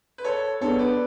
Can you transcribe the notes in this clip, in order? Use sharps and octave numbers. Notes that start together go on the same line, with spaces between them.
B4
A4 C#5
B3 D4 G#4 A4 C#5
B4 D5